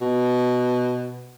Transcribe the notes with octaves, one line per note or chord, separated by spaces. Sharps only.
B2